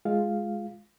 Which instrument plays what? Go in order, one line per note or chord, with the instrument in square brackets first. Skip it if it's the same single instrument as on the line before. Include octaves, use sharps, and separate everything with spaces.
[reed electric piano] G#3 F4 F5